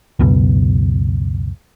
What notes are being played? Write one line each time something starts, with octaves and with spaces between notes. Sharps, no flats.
C#2 F#2 B2